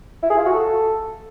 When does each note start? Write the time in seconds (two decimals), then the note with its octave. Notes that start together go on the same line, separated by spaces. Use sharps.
0.23 E4
0.30 G#4
0.38 F4
0.45 F#4
0.53 A4